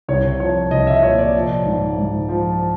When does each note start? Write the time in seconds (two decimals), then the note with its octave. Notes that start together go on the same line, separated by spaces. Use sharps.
0.08 C2 C#5
0.40 F3 C#5
0.71 C2 D#5
0.87 E5
1.03 A#2 C#5
1.18 D5
1.34 F3
1.66 G#2
1.98 G#2
2.29 F3